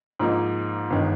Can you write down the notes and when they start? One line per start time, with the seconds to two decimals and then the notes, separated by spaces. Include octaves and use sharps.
0.19 G#2 F3 A#3 D#4
0.90 G1 D#3 G#3